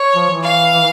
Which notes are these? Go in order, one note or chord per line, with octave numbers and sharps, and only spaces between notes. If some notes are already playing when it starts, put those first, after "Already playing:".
Already playing: C#5
F3
E3
F5